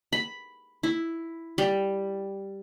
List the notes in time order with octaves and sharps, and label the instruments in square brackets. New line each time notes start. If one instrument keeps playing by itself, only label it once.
[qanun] B5
E4
G3